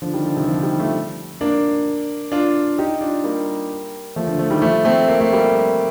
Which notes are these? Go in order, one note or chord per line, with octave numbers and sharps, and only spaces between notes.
D3 F3
D#3 G3
D3 F3
C3 D#3
D3 F3
D#3 G3
F3 A3
A#3 D4
D4 F4
D#4 G4
D4 F4
G3 A#3
F3 A3
D3 F3
F3 A3
D#3 G3
F3 A3
A3 C4
A#3
A3
G3 A#3